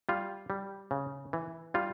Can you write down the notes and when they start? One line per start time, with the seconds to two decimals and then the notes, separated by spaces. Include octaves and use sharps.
0.09 G3 F4
0.50 G3
0.91 C#3
1.33 E3
1.74 G3 F4